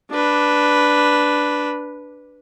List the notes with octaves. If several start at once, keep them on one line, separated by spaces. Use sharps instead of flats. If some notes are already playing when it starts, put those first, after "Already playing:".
D4 B4